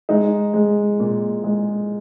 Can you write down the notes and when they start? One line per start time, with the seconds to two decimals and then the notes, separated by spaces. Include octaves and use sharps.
0.09 G#3 D#4
0.54 G#3
1.00 A#2
1.44 G#3